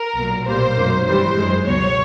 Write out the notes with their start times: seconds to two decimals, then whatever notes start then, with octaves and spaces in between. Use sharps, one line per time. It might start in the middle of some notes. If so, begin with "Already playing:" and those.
Already playing: A#4
0.14 B1 A#2 F#3
0.45 B1 A#2 G3 A#3 C5
0.76 G#1 F#2 D#3 F#3 A#3
1.05 G2 E3 G3 C5
1.37 F#2 D#3 G#3
1.66 C#2 B2 F#3 C#5